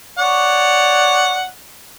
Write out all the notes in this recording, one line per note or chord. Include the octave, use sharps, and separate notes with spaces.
C#5 D5 F#5